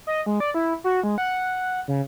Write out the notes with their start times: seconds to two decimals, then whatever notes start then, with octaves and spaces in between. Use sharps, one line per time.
0.07 D#5
0.26 G#3
0.40 D5
0.54 E4
0.84 F#4
1.04 G#3
1.18 F#5
1.88 C#3